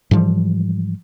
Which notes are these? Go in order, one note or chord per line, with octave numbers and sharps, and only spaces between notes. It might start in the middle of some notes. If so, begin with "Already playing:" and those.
G#2 E3 F3 G3